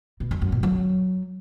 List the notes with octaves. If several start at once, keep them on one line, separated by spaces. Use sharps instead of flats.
B2
F#2
F#2
B2
F#3